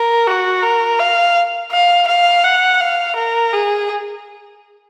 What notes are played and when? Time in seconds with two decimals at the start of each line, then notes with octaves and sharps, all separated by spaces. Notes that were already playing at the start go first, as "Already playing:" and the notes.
Already playing: A#4
0.27 F#4
0.63 A#4
1.00 F5
1.72 F5
2.08 F5
2.44 F#5
2.80 F5
3.16 A#4
3.53 G#4